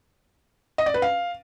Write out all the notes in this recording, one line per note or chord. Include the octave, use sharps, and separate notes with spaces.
D#5
D5
B4
F5